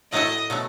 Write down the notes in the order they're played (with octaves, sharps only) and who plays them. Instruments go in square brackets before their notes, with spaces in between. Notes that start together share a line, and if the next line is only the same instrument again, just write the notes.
[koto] A2 F#3 A3 E4 A4 [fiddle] D#5
[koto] B2 F#3 A3